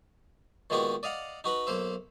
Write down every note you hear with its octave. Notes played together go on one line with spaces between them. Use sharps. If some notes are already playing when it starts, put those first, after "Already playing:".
A#2 D#3 G#3 B3 F#4 G4
D5 D#5 F5 F#5
D#4 F#4 B4 B5
B1 A#3 C5 E5